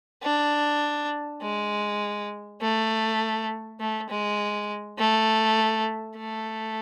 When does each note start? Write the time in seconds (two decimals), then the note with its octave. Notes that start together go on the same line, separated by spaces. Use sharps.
0.23 D4
1.42 G#3
2.62 A3
3.80 A3
4.09 G#3
4.99 A3
6.18 A3